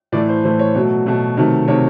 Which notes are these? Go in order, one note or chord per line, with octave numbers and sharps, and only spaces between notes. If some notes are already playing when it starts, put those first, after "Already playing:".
A2 E3 A3 D5
C5
A2 E3 A3 C5
C#5
B2 F#3 A3 C#5
B2 F#3 A3
C3 D#3 F#3 A3
C3 D#3 F#3 A3 C#5